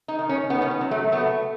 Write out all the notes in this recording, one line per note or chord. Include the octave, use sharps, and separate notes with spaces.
D#4
D#3
C#4
D#3 B3
C#4
B3
F#3
A3
A3 B3